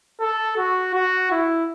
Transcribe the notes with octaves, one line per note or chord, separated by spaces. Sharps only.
A4
F#4
F#4
E4